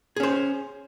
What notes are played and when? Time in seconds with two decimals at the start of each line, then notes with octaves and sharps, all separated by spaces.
0.16 G#4
0.20 C#4
0.23 C5